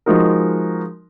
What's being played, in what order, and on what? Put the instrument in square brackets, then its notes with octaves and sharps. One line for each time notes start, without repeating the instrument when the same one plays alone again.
[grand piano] F3 G#3 D#4 F#4 A#4